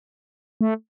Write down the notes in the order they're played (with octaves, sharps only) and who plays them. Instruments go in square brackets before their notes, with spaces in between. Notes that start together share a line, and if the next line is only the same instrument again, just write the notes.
[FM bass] A3